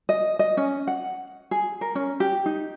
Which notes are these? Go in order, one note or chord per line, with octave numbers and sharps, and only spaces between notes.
D#5
D#5
C#4
F#5
G#4
A#4
C#4
G4
D#4